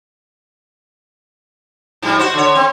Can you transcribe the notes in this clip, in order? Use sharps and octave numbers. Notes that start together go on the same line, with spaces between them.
G#2 F3 G3
F#4 C5
D3 C#5
C4